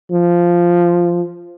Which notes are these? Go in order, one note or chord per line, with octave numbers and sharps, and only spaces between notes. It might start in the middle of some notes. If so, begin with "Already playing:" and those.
F3